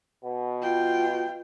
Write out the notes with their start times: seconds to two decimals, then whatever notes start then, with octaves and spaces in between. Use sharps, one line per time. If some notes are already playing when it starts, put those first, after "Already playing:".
0.24 B2
0.62 F4 G5